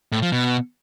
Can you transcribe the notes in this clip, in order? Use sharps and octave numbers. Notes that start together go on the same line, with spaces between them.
A2
F3
B2